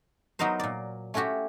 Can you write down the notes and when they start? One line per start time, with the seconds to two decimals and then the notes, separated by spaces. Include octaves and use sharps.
0.39 F#3 B3 D#4 A#4 C5
0.60 A#2 D5
1.14 A3 C#4 E4 F#4 G4